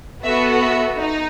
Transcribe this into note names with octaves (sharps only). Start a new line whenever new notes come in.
B3 F#4 A4 E5
E5
D#4